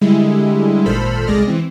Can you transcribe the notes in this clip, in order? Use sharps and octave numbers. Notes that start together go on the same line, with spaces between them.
D3 G3 G#3 E4
G#1 A#2 A4 C5 B5 F6
C2 G#3 G#4 D5 F6 A#6
E3 C4